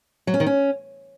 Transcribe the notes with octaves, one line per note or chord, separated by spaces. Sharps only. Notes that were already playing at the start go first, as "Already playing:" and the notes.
F#3
C#4
D#3
C#4